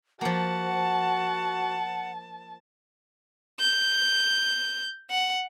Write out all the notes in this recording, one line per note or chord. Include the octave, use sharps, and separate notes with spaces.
F3 A#3 F#4 F#5 A5
G6
F#5